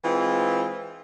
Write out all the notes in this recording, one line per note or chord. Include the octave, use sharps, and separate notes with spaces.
E3 G#3 C4 F4